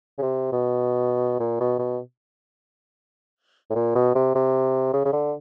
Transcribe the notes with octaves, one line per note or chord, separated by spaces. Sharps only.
C#3
C3
B2
A#2
B2
B2
A2
A#2
B2
C3
C3
C#3
C#3
D3